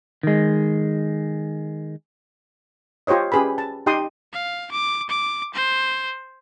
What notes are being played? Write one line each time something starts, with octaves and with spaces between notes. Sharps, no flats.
D#3 G#3
F4 G4 C5 C#5 D#5
C#4 G4 G#4 B4 B5
A5
D#4 G4 G5 C6 D#6
F5
D6
D6
C5